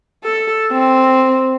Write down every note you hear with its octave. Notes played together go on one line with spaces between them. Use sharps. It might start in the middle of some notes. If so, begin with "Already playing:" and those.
A4
C4